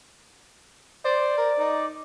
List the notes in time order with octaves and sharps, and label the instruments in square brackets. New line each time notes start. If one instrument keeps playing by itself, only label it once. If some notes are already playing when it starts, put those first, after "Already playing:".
[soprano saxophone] C5 [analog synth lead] D5
[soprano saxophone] A#4
D#4